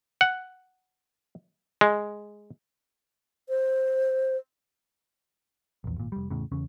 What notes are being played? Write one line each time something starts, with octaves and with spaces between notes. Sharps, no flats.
F#5
G#3
C5
A#1 E2
G#1 A#2
F1 G3
E2 A2 C#3
E2 C#3 C#4